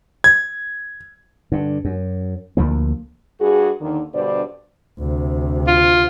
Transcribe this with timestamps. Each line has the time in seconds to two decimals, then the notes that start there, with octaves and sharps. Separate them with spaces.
0.24 G#6
1.52 G2 D3
1.85 F#2
2.57 D2 F3 A#3
3.40 G2 F#4 G#4
3.80 D#2 D3 D#3
4.13 G2 B2 D3 C5 D5
4.99 D2 C3
5.67 F4